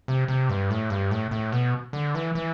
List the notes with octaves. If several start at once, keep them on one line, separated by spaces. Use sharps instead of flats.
C3
C3
G2
A2
G2
A2
A2
B2
D3
E3
E3